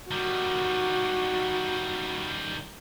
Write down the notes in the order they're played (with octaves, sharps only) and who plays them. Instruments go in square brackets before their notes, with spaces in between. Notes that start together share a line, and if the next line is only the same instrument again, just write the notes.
[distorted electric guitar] D#3 G3 [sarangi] F#4